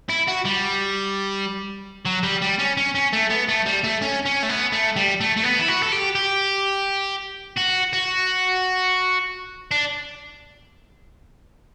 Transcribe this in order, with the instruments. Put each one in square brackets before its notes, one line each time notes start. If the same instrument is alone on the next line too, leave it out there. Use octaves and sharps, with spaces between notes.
[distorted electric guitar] E4
F#4
G3
F#3
G3
G3
C#4
C#4
C#4
A3
B3
A3
G3
A3
C#4
C#4
A3
B3
A3
G3
A3
A3
B3
E4
F#4
A4
G4
G4
F#4
F#4
D4